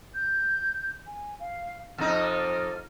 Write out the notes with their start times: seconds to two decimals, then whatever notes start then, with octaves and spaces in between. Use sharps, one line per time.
0.14 G6
1.07 G#5
1.40 F5
1.98 F2 D#4 F6